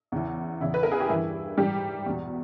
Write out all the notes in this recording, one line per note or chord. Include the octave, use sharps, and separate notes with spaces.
E2 C#3 E3
E2 C#3 E3 E4
B4
A#4
G#4
G4
G2 E3 E4
G#2 E3 G3 G4
E2 B2